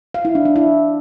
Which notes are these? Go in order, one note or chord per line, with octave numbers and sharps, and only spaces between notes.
F5
E4
D4
D4
E4